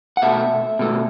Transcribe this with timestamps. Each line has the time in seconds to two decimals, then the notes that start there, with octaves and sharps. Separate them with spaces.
0.17 F#5
0.22 B2 A3 E5
0.79 B2 A3